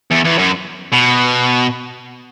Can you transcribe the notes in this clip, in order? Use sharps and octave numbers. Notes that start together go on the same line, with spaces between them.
E2
E2
F#2
B2